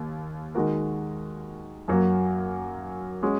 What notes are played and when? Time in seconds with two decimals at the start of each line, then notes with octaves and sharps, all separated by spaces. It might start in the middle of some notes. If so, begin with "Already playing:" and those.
Already playing: D#2
0.55 D#3 G#3 F#4 A#4
1.88 F#2 F#3 A#3
3.23 G#3 C#4 F#4